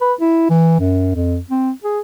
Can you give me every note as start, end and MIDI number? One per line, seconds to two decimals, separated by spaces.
0.01 0.14 71
0.21 0.46 64
0.50 0.78 52
0.80 1.11 42
1.15 1.38 41
1.51 1.71 60
1.84 2.00 68